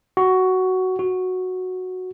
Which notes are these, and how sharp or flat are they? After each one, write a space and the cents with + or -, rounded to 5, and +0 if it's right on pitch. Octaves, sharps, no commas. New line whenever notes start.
F#4 +10
F#4 -5